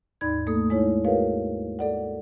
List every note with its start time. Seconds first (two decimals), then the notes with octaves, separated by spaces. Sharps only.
0.21 D#2 G#2 D#4 D5 B5 G#6
0.47 A3 A#3 A4 D#6
0.70 G#3 D#4 E4 C#5
1.05 F#4 G#4 A#4 B4 C#5 F5
1.79 A4 D5 F#5